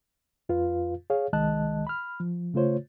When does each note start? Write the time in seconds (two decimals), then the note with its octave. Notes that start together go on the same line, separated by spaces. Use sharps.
0.49 F2 F4 B4 F5
1.10 G#4 C#5 F5
1.33 C2 D#3 G#3 D#5 A5 F#6
1.87 B5 F6
2.20 F3
2.54 C#3 A3 F4 C5 C#5